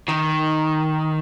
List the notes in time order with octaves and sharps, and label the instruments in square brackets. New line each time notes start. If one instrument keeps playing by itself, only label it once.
[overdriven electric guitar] D#3